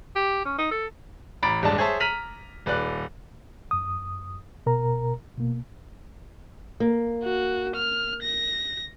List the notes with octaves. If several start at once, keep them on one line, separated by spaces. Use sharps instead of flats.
G4
C#4
D#4
A4
A1 A#5 B5 D6 A6 D7
D#1 G2 G#3 D4 A5
G#4 C5 C#5 E5 A5
A#5 F6 B6 D#7 F7 F#7
D#1 B4 D5 F#6
F#2 D#6
B2 A#4 A#5
B2 A#3
A#3
F#4
F6
A#6